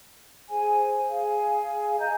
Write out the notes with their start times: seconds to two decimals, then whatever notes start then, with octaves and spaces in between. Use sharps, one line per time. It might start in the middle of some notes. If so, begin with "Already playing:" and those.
0.50 G#4 C5 G#5
1.09 G#4 F5 G#5
2.00 D#5 G#5 A#5 G6